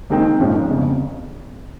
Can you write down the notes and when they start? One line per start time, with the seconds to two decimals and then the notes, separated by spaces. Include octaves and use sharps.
0.10 D#2 D#3 G#3 C4 D#4
0.40 A#1 G#2 F3 G#3 C#4
0.70 G1 F2 C#3